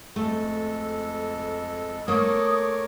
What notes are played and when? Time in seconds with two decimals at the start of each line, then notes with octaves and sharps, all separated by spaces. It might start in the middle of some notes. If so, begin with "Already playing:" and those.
0.16 F2 G#3 A3 A4
2.08 A3 A#3 A#4 C#5 D6 D#6